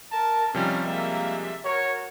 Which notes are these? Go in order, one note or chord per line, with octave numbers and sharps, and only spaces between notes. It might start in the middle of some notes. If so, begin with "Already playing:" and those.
A#4 A5
C3 F3 G3 C#4 D#4 F6
G#3 A#3 E5
F#4 A#4 C#5